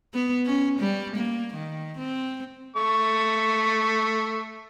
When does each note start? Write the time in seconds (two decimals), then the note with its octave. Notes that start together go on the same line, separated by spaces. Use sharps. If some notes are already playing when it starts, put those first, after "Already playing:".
0.14 B3
0.46 C#4
0.79 G3
1.16 A#3
1.54 D#3
1.98 C4
2.76 A3 C#6